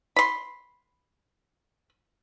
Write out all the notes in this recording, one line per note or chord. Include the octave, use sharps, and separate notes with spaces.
B5 C6